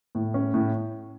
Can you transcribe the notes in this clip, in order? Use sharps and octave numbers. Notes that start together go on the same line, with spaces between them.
A2
C#4
A2